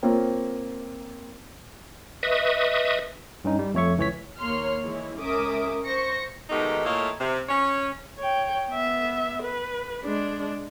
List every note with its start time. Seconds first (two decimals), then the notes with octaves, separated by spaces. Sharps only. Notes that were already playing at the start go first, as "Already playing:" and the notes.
0.03 A#3 C4 F4 C#5
2.23 B4 D#5 E5 C#6 D#6
3.44 G2 C#4 D#4
3.59 G3
3.74 F2 A3 C#5 E5 C#6
3.97 C#2 E3 C#5 B6
4.39 D#2 A#3 C#5 C6 F6
4.81 E3 G#3 E4 C#5
5.20 C#2 C#4 A#4 E5 D6 D#6
5.86 C5 C#6 A#6 C#7
6.50 B2 D#3 G#3 A3 D#4 G4
6.85 A#2 A3 E4 C#5 D#5 F5
7.20 C3
7.49 C#4 C#5
8.18 C#5 G5
8.70 B3 E5
9.43 B4
10.05 G#3 D4